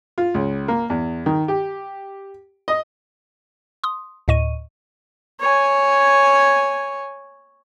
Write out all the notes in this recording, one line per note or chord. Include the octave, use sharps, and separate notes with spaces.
F4
C#2
A#3
E2
D#3
G4
D#5
C6 D#6
D2 A2 D#5 C#6 D#7
C#5 G#5